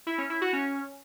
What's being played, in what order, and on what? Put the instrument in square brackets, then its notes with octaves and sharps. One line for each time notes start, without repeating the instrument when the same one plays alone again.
[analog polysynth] E4
C#4
E4
F#4
C#4